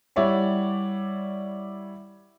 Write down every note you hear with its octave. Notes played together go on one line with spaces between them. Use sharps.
G3 E4 C#5 D5 E5 F#5